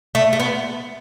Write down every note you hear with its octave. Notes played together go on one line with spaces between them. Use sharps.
A3
A3
B3